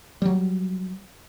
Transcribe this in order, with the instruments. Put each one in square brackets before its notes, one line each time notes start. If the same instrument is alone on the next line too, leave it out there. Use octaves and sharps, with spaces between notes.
[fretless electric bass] F#3 G3